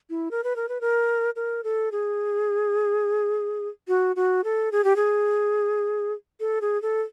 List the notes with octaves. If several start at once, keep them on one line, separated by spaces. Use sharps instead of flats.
E4
A#4
B4
A#4
B4
A#4
A#4
A4
G#4
F#4
F#4
A4
G#4
G4
G#4
A4
G#4
A4